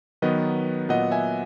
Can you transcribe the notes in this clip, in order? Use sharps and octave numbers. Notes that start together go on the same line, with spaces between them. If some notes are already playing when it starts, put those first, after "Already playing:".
D#3 F#3 B3 B4 D#5
A#2 F#3 B3 D#5 F#5
E5 G#5